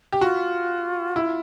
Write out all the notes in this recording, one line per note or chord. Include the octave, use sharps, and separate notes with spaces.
G4
F4 F#4
E4